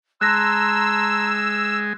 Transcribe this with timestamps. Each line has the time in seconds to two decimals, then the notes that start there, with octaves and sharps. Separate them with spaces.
0.21 G#3 A5 A#5 C6 E6 F#6 A#6